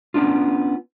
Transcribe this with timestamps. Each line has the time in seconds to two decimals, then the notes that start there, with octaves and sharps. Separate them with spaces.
0.14 B3 C#4 D4 F4